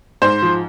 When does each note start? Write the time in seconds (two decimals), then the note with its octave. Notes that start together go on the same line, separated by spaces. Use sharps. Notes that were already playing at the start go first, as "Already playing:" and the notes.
0.22 G#2 C5
0.42 F3